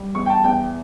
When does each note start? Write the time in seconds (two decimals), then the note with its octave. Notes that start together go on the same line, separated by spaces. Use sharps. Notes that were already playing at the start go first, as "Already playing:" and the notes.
Already playing: G3
0.15 E2 C#6
0.26 G5
0.30 A5
0.44 E2 G5